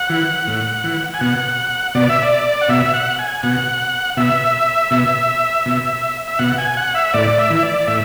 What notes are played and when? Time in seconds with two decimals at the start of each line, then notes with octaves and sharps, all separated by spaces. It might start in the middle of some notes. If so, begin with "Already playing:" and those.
Already playing: F#5
0.10 E3
0.47 A2
0.84 E3
1.14 G#5
1.21 B2 F#5
1.95 B2 D5
2.09 E5
2.22 D5
2.61 F#5
2.69 B2 E5
2.94 F#5
3.19 G#5
3.43 B2 F#5
4.17 B2 E5
4.91 B2
5.66 B2
6.28 E5
6.39 B2 F#5
6.58 G#5
6.77 F#5
6.95 E5
7.14 A2 D5
7.38 E5
7.50 E3
7.56 E5
7.63 D5
7.87 A2 E5